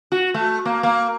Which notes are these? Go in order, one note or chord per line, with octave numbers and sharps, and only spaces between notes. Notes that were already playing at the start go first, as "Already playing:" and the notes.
F#4
A3
A#3
A#3